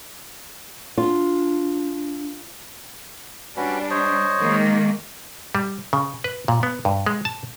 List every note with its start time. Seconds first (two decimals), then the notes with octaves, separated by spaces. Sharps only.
0.98 D4 F4
3.57 G3 C#4 D4 F#4 B4
3.90 C5 C#5 D#5
4.40 D#3 G#3 A#3
5.55 G3
5.93 C#3
6.24 B4
6.48 A#2
6.63 B3
6.85 G2
7.06 G#3
7.25 A5